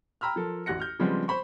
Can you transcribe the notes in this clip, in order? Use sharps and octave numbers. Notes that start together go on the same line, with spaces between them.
G5 A#5 B5 E6 F6
F3 A4 A#4
A1 F#4 F#6 A#6 C#7
F6 G6
C#3 F3 G3 G#3 B3 C4
C5 B5 C#6